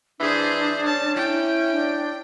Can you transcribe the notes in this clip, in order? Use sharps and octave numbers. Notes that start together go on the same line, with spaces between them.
E3 D4 G#4 C5
C#4 A5
E4 G5
D4